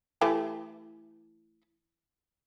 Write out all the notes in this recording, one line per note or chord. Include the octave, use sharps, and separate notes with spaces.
E3 A3 G4